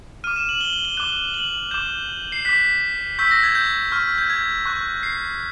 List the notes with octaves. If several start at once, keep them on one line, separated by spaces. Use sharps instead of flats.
D6 F6 D#7
E7
F#7
G7
G7
G7
D6 F#6 G7
F#7
D6 G6 E7
C7
D6 F#6 B6
C#6 E6 G6 B6
A#6
G#6
G6
C#6 F6
G6
G#6
C#6 F#6
C7